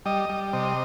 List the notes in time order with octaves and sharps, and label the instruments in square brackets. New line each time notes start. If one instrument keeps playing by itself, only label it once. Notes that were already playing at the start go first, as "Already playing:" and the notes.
[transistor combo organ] G3 D#5
G3
C3 D#5